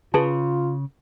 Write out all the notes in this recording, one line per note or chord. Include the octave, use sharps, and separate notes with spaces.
C#3 F4 G#4 B4 A5